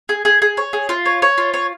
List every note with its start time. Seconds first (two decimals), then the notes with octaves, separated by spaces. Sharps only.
0.09 G#4
0.25 G#4
0.42 G#4
0.57 C#5
0.73 G#4
0.89 F4
1.05 C#5
1.22 C#5
1.38 F4
1.54 C#5